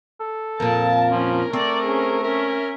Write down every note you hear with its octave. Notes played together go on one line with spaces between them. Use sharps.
A4
F2 A#2 A#4 A5
F3 C#4
A3 C4 D5
C#4 G#4
C#4 A#4 E5